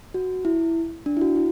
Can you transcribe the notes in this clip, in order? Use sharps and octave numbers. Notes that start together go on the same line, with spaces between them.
F#4
E4
D4
E4
F#4
E4